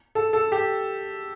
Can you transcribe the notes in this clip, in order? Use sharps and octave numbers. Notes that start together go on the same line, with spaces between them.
A4
A4
G4